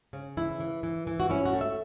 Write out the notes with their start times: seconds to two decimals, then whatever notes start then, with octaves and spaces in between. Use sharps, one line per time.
0.13 C#3
0.37 E3 E4
0.60 E3
0.83 E3
1.07 E3
1.20 F#4
1.30 C#4 E4
1.45 F#4
1.53 A3
1.61 E5